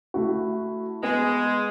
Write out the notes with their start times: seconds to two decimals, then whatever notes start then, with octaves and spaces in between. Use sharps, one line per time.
0.14 A3 E4 F#4
1.03 G#3 B3